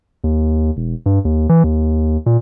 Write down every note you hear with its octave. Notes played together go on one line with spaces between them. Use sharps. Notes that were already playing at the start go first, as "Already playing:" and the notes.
D#2
E1
G2
D#2
E3
D#2
A#2